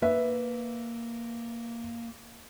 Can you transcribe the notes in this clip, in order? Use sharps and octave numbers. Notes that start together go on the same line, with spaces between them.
A#3 B4 E5